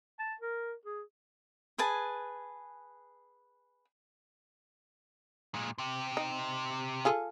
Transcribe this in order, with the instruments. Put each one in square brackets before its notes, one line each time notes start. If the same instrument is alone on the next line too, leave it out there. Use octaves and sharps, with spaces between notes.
[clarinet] A5
A#4
G#4
[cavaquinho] G#4 B4 G#5 A5
[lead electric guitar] A#2 G#3
C3 G4
[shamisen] D#4
F4 G#4 A4